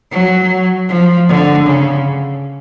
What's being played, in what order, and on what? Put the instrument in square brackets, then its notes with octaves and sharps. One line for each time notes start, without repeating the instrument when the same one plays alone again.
[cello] F#3
F3
D3
C#3